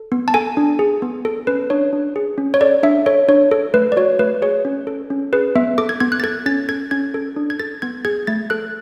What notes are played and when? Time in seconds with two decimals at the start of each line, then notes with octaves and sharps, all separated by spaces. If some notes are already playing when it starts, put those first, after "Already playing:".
Already playing: A4
0.12 B3
0.28 A5
0.34 A4 G#5
0.57 D4
0.79 G#4
1.02 B3
1.25 A4
1.47 C#4 B4
1.70 D4 C#5
1.93 D4
2.16 G#4
2.38 C#4
2.54 C#5
2.61 A4 D5
2.83 D4 E5
3.06 A4 C#5
3.28 D4 C#5
3.51 A4
3.74 A3 B4
3.92 D5
3.97 F#4 C#5
4.19 A3 B4
4.42 G#4 C#5
4.65 C#4
4.87 A4
5.10 C#4
5.33 G#4 B4
5.55 B3 E5
5.78 A4 D6
5.89 G#6
6.00 B3 G#6
6.12 F#6
6.20 A6
6.24 A4 G#6
6.46 C#4 A6
6.69 A4 G#6
6.91 C#4 G#6
7.14 A4
7.36 D4
7.50 G#6
7.60 A4 A6
7.82 B3 G#6
8.05 G#4 G#6
8.27 A3 A6
8.50 A4 F#6